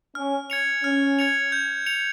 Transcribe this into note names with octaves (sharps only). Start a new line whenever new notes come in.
C#4 F6
G#6 C#7 F7
C#4 F6
G#6 C#7 F7
G6
C#7 F7